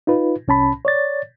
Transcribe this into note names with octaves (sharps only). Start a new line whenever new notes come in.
D#4 F4 B4
C2 C#4 A5 B5
C#5 D5 A6